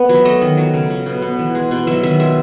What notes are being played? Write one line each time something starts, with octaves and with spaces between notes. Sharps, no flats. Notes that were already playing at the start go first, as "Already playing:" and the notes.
Already playing: B3 B4
F#3
E5
A3 D#5
D#3
F#3
C#3
F#3
B2
B3
E3
G#3
B2
F#3 E5
D#3 E5
G#3 E5